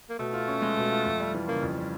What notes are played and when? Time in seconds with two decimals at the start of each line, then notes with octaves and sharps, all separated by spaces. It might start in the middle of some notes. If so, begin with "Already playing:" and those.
0.09 A#3
0.19 B2 A3
0.33 F4
0.48 C#4
0.62 G#3
0.77 B2
0.90 F4
1.06 F2
1.20 G3
1.34 E3
1.48 C#3 A#3
1.63 F2
1.78 G3